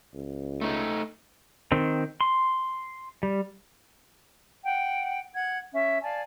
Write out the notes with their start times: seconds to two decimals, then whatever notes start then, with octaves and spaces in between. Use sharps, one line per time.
0.14 C#2
0.61 A3 D#4
1.72 D#3 C4
2.21 C6
3.23 G3
4.64 F#5 G5
5.34 F#5 G#6
5.73 C#4 E5
6.02 D5 F5 G#5 A5